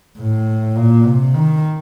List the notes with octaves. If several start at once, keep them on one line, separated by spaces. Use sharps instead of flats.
A2
A#2
C3
D#3